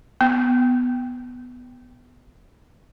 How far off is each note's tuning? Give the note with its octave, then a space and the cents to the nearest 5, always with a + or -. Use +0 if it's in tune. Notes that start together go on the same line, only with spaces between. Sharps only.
B3 +5